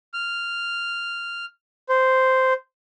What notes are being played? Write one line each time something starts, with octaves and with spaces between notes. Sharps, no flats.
F6
C5